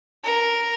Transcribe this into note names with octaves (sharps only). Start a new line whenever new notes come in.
A#4